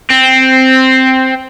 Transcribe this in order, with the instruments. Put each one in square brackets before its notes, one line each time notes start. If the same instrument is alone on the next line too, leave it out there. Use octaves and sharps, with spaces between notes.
[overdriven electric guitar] C4